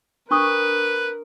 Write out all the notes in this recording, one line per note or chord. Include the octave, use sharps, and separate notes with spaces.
D4 A#4 B4 C#6 D#6